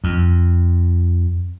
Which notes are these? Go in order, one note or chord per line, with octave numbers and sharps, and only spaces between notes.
F2